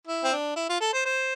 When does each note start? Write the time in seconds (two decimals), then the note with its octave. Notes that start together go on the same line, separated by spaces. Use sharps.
0.08 E4
0.24 C4
0.32 D4
0.56 E4
0.69 F4
0.81 A4
0.93 C5
1.05 C5